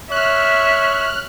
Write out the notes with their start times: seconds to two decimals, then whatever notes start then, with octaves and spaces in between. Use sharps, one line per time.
0.12 C#5 E5 F6 F#6